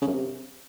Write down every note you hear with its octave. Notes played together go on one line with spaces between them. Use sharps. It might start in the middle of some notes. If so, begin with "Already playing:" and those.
C#3
F#2
C3